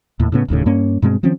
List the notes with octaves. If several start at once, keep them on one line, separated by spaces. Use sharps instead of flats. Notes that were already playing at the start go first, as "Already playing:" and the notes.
D#2 A2
A2 C#3 B3
D#1 D#2 A2 C#3
G2 A#3 C#4
G2 B2 G#3 C4
D#3 F3 C4 C#4